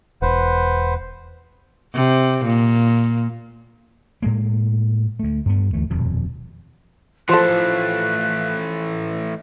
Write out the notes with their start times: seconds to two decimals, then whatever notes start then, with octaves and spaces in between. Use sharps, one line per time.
0.22 E1 B4 C5 F#5
1.94 C3
2.44 A#2
4.22 A2 G#3 A#3
5.19 D2 A3
5.46 G2 B3
5.73 D2 E3 A3
5.90 D#1 F2 B2
7.29 E3 F3 A3 A4 C5 F5 F#6